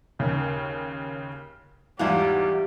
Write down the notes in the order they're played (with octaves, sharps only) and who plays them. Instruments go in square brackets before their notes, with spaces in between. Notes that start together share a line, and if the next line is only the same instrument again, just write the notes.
[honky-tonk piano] D#2 C#3
[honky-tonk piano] E2 G#2 E3 [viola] G3 G4 [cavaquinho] E4 F4 F#5